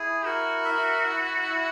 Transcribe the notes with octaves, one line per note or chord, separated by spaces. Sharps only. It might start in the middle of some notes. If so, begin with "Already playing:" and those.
Already playing: E4 G#4
F#4 A#4
E5
E4
E4